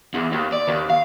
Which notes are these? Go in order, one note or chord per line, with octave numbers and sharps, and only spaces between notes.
E2
D#2
D5
D#2
F5